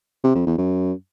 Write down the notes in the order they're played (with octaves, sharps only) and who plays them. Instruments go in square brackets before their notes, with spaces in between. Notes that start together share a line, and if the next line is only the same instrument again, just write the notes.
[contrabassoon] C3
F2
E2
F#2